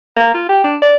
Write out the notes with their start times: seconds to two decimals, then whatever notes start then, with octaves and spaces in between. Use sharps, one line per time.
0.16 A#3
0.34 F4
0.49 G4
0.64 D4
0.82 D5